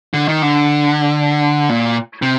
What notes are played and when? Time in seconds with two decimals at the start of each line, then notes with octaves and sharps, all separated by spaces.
0.14 D3
0.28 D#3
0.42 D3
1.69 A#2
2.22 C3